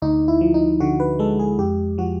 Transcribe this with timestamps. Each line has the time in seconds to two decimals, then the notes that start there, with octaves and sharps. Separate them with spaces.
0.02 D2 D#4
0.28 E4
0.41 F3
0.54 D#4
0.80 D3 F#4
1.00 B4
1.19 G#3 A4
1.39 G#4
1.59 F2 G4
1.98 F3 F#4